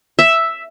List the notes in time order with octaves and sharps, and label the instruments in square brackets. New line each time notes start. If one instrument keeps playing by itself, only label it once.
[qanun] E5